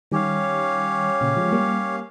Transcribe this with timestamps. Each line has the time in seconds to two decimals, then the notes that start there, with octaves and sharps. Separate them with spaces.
0.12 D#3 G3 C#4 G4 C#5 F5
1.21 A#2 C#3
1.37 F3 G#3
1.52 G3 A#3